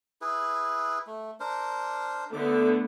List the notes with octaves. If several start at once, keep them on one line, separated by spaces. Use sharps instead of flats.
E4 G#4 B4
A3
D4 A#4 C5
D3 A3 B3 D6